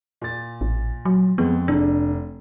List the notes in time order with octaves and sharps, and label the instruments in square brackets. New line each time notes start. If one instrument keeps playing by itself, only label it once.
[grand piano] A#2 A6
[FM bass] A1
F#3
[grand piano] F2 G#3 [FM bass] B3
[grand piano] F1 [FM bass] D4